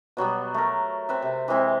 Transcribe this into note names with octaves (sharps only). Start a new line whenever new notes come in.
B2 F#3 G3 B3
A3 A#4
C4 B4 E5
C3
E3 G#3 C4 E4